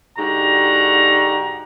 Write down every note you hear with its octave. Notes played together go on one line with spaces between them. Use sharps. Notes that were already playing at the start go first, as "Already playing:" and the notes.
G#2 D3 F#4 G4 A#5